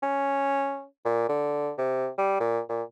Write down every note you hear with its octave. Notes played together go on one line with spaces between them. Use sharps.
C#4
A#2
D3
C3
G3
A#2
A#2